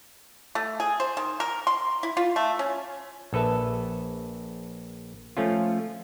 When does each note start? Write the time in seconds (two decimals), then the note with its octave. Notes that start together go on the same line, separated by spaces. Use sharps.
0.55 A3
0.80 G#4
1.00 C5
1.17 D#3
1.40 A#4
1.67 C6
2.03 E4
2.17 F4
2.36 A3
2.59 C#4
3.33 A#1 A4 B4 E5 A5
5.37 F3 A3 C#4 F4